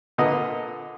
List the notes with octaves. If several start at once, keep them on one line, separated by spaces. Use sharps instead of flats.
A#2 D3 B4 D#5 D#6